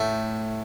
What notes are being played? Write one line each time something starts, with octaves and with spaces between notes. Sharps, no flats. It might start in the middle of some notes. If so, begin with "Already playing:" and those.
Already playing: A2 A3